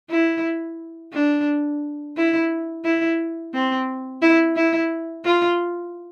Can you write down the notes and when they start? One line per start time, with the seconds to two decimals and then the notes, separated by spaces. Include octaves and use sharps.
0.10 E4
1.13 D4
2.17 E4
2.85 E4
3.54 C4
4.22 E4
4.56 E4
5.25 F4